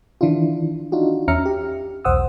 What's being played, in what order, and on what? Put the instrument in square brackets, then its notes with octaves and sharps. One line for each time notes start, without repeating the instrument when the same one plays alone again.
[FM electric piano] D#3 E3 D4 E4 F4
D4 D#4 F4 F#4
E2 C#4 E5 A#5 F6 C#7
G4
B1 E2 C5 F#5 D#6 E6